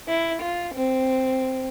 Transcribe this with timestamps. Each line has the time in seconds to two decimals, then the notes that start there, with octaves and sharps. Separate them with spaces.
0.08 E4
0.42 F4
0.75 C4